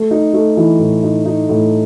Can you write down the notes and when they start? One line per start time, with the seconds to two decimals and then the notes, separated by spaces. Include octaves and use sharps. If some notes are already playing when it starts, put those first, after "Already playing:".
Already playing: A3
0.11 D#4
0.34 A3
0.57 E3
0.79 A2
1.03 D#4
1.26 D#4
1.49 A2